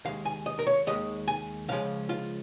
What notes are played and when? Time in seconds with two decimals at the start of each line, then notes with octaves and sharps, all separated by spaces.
0.05 D#2 D#3 G#3 F5
0.26 G#5
0.46 D#5
0.59 A#4
0.67 C#5
0.87 D#2 D#3 G#3 D#5
1.28 G#5
1.68 C#2 C#3 F3 G#3 F5
2.09 F4